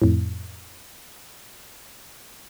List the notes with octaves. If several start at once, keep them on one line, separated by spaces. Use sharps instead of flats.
F2 A2